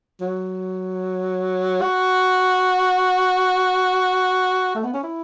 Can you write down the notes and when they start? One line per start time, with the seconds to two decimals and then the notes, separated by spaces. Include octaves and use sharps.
0.21 F#3
1.82 F#4
4.76 A3
4.84 B3
4.94 C#4
5.04 E4